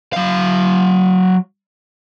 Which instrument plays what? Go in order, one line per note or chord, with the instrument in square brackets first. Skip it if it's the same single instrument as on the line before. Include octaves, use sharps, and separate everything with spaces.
[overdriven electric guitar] F#3 F5